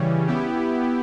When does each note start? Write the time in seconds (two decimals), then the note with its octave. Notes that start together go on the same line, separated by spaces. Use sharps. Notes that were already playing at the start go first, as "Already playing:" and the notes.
Already playing: C#3 E3 G3 C#4
0.27 B3 E4 G4